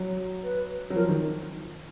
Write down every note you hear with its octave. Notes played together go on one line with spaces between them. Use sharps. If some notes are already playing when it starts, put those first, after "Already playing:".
Already playing: F#3
B4
F#3
F3 A#4
D#3